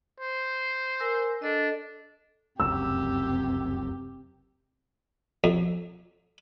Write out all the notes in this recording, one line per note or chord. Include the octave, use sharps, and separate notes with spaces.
C5
A#4 G#5 E6
D4 A4 D#5
F1 C#2 F#2 C3 G4 E6
F2